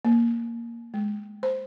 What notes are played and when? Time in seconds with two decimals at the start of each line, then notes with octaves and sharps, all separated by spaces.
0.05 A#3
0.94 G#3
1.43 C5